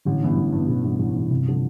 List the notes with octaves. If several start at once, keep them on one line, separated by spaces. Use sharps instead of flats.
A1 D3
G2 E3 B3
A1
G2 E3 B3
A1 B2
G2 E3 B3
A1
G2 E3 B3
G1 C3
D3 F3